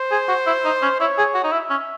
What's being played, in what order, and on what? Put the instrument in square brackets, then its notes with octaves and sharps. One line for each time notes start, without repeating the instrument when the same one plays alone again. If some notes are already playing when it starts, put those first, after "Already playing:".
Already playing: [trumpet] C5
[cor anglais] G#4
F#4
E4
D#4
C#4
[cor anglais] E4 [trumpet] C#5
[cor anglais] G#4
F#4
D#4
[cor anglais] E4 [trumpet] E5
[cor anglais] C#4